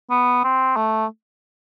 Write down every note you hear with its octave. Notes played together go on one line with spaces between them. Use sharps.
B3
C4
A3